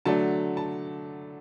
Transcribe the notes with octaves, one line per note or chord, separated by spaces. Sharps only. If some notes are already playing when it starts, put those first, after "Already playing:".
D3 F#3 A3 D4 A5
A5